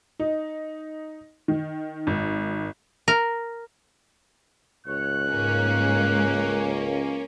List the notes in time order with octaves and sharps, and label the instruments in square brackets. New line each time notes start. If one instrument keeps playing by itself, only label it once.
[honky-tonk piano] D#4
D#3
G#1
[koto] A#4
[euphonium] C#2 [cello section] C#5 [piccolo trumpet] F#6
[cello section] G#2 G#3 [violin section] A#3 C#4